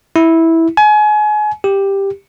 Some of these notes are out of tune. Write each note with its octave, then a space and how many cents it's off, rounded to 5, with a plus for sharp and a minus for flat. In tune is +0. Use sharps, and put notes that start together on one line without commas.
E4 -10
G#5 +30
G4 +5